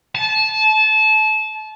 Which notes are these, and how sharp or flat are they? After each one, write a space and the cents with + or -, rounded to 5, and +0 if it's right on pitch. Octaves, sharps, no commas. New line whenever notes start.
A5 -25